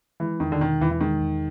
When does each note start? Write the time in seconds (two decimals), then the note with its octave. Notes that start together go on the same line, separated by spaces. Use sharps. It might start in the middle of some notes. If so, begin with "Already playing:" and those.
0.20 E3 G#3
0.40 E2 D#3
0.52 D3
0.61 B2 D#3
0.81 E2 E3
0.91 E3
1.00 D#3 G#3
1.21 E2